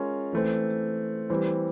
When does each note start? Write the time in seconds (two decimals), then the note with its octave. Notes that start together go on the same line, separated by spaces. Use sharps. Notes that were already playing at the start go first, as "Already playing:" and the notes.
Already playing: G#3 C#4 F4 A#4 C#5
0.33 E3 A3 C4
1.30 E3 G3 C4